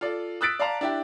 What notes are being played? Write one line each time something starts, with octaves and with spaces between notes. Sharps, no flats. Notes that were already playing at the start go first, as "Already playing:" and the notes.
F4 A4 D5
D#6 E6 F#6 A6 B6 D7
D5 F5 A5 A#5
D4 E4 G4